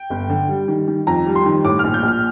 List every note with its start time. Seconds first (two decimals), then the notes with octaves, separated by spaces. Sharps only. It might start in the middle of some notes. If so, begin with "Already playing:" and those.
Already playing: G5
0.10 G1
0.30 D3
0.49 G3
0.68 D#3
0.88 D#3
1.07 F2 A#5
1.26 G3
1.35 C6
1.46 D#3
1.64 A2 D6
1.79 A#1 F6
1.94 G6
2.03 A#1
2.08 F6